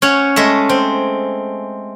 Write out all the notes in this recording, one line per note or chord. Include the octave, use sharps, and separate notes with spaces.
C#4 C#5 F#5
G#3 A3 E5
C4